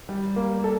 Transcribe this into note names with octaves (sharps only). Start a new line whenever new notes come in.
G3
A#3
A4